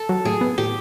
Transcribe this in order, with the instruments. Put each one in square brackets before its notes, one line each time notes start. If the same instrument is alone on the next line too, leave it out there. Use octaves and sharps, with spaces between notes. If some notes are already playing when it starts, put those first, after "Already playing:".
Already playing: [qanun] A4
[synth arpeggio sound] F#3
[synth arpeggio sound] A2 [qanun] G#4
[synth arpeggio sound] B3
[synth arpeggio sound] A2 [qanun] G4